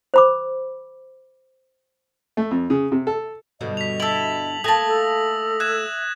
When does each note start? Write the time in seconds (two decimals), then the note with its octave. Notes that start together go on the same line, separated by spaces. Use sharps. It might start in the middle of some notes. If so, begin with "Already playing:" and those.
0.14 C5 B5 D6
2.37 A3
2.51 F2
2.70 C#3
2.92 C3
3.07 A4
3.61 G2 B2 D3 D#5
3.77 B6 F7
4.00 E4 A4 F#7
4.64 A3 A#3 G#5 A5 D#6 A#6 F#7
4.87 A4
5.60 E5 F#6 G#6 E7